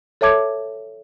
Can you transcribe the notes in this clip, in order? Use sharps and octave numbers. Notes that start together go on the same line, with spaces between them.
A4 C#5 E5 A5 D6 G#6